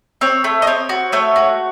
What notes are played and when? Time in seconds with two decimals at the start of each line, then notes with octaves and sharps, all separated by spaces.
0.21 C4 C#5
0.44 A3
0.62 D#5
0.67 C4 C#5
0.89 F#4
1.12 A3 C#5
1.36 F#4